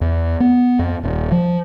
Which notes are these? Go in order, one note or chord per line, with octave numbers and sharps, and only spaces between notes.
E2
B3
F2
D#1
F3